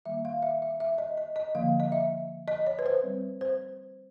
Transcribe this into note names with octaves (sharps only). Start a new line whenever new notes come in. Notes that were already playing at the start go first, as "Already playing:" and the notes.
D#3 G3 A#3 E5
F5
E5
E5
E5
D#5
D#5
D#5
D3 F3 A#3 F5
D#5
E5
D#5
C#5
B4
C5
G3 C4
C5